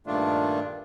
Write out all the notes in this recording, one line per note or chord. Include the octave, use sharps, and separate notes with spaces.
G2 A#2 D#3 A3 D4 F4